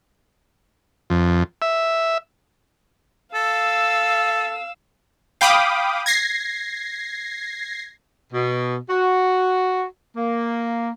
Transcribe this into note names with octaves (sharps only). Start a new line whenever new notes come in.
F2
E5
A4 F5 E6
F5 G5 B5 D6 D#6
G#6 A#6 C7
B2
F#4
A#3